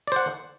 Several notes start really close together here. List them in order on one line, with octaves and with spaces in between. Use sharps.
D5 C5 F#5